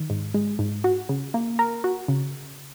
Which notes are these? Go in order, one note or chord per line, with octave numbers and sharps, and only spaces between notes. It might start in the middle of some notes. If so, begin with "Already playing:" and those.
Already playing: D#3
G#2
G#3
G#2
F#4
C#3
A#3
A#4
F#4
C#3